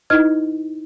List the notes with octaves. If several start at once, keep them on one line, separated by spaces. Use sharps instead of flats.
D#4 E4 B4 D#5 F6 G#6